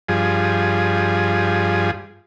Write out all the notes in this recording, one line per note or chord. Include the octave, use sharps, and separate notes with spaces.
G2 F3 G#4